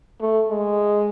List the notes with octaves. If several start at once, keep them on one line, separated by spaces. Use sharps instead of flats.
A3
G#3